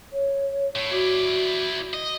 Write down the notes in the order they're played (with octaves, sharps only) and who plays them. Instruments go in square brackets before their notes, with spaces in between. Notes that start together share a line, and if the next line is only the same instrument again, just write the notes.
[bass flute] C#5
[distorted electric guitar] A2
[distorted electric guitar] E4 D5 [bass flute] F#4
[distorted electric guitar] D#5